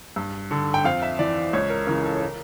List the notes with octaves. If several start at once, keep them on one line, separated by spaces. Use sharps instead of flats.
G2
D3
G5
F2 F5
E5
E3 D5
C#2 C#5
A#4
C#3 E3 A#4
A4
C#5
A#4